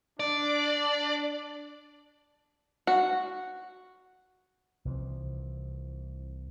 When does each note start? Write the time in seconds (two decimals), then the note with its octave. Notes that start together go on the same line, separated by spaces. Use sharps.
0.20 D4 D5
2.87 F#4
4.85 C2 E3 F3